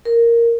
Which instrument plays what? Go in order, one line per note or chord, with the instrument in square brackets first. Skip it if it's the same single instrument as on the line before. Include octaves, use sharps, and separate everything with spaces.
[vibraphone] A#4